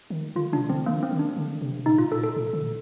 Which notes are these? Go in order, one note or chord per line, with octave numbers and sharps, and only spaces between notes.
D#3
D3 F4
C3 D4
D3 C4
D#3 A#3
C4
D#3
D4
D3
C3
A#2 D#4
F4
A4
A4
A#2
D3